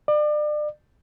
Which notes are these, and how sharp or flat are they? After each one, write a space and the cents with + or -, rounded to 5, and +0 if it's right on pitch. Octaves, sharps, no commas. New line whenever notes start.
D5 +35